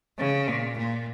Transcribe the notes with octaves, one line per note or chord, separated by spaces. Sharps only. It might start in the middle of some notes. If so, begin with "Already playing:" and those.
C#3
A#2
A#2